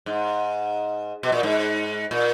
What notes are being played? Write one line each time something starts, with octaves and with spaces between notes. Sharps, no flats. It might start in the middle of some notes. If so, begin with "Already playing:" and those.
G#2
B2
A#2
G#2
A#2